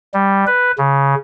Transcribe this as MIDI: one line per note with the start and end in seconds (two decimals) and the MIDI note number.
0.14 0.45 55
0.47 0.72 71
0.78 1.15 49